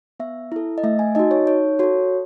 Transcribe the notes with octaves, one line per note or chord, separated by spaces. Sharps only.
B3 E5
E4 A4
D#5
A3 E5
G#5
D#4 F#4 D#5
C#5
D#4 C#5
F#4 A4 C#5